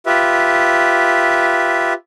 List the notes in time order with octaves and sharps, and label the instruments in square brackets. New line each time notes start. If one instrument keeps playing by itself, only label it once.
[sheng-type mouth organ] F4 G4 B4 E5